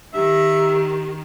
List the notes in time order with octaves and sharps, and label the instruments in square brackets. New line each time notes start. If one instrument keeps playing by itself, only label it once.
[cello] D#3 [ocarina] G4 [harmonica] E5